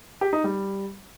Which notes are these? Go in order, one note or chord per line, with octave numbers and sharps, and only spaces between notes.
G4
D#4
G3